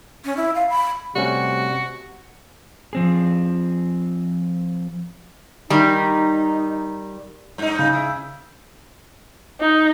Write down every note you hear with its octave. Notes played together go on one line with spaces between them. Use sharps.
C#4
E4
F5
B5
C3 G3 A3 C#4 F#4
F3 C4 G#4
D#3 G3 D#4
G2 D#4
C#3
E4
D#4